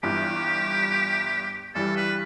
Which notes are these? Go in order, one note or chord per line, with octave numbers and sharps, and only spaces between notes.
G1 G2 E3 G4
G2 E3 G3 A4
B4